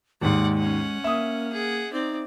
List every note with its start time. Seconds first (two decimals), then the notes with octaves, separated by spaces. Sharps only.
0.22 D#2 G#2 G#3 D5 F#5
0.58 C#4 F#5
1.04 A#3 E5 D#6
1.52 G#4 F#5
1.92 C4 D#4 D5